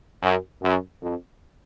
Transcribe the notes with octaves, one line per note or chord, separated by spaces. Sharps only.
F#2
F#2
F2